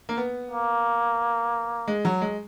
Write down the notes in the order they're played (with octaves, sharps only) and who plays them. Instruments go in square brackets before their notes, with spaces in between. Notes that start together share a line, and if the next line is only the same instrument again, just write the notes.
[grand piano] A#3
B3
[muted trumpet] A#3
[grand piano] G#3
F#3
G#3